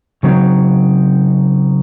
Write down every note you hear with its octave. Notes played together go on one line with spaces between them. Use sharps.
C#3 F#3 C4 D#4